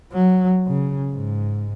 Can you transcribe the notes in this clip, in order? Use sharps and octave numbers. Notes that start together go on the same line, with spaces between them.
F#3
C#3
G#2